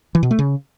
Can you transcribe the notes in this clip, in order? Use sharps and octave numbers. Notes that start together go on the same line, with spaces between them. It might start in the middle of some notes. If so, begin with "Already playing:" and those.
E3
B2
A3
C#3